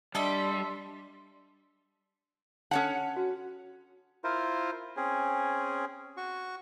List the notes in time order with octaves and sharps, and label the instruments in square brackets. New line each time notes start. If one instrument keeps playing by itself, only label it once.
[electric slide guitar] G3 [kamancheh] D4 C6 [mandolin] A4 D#5 E5
[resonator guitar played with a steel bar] C#4 C#5 F#5 [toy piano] A4 A5
[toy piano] F#4
[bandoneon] E4 F4 A#4 C5
C4 C#4 G#4
F#4 C#6